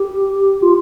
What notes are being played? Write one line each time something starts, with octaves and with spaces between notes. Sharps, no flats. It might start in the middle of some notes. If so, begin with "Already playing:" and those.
Already playing: G4
F4